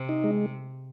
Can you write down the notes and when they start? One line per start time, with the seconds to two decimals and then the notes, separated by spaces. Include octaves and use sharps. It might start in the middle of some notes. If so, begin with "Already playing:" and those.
Already playing: C3
0.09 D#4
0.24 G#3